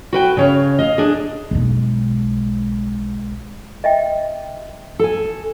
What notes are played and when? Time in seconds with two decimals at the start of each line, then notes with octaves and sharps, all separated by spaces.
0.13 F#4 B4 G5
0.37 C#3 C#5 F5
0.79 D#5 F5
0.98 D4 G#4
1.51 B1 G#3
3.84 D#5 E5 G5
4.99 A4 G#5